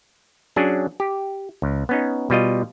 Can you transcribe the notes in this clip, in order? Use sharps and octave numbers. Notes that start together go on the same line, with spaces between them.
F#3 C#4 D4 G#4
G4
C#2
B3 C#4 D#4
B2 G3 F4 D#5